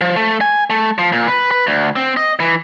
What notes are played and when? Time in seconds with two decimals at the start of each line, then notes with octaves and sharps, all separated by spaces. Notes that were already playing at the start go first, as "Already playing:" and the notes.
0.01 F3
0.16 A3
0.41 G#5
0.70 A3
0.98 F3
1.12 A#2
1.28 B4
1.51 B4
1.67 D2
1.96 C4
2.17 D#5
2.40 E3